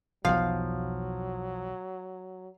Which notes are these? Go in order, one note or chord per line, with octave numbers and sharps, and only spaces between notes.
B1 E2 B2 F3 F#3 F5